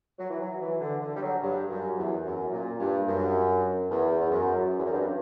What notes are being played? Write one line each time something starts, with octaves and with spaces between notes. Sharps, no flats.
F#3
E3
F#3
E3
D3
D3
G3
F#3
G2
F#2
E2
F#2
A#2
G2
F#2
E2
E2
F#2
E2
F#2
G2